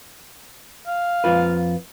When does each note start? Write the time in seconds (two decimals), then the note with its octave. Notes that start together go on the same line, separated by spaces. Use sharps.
0.87 F5
1.24 F2 F4 B4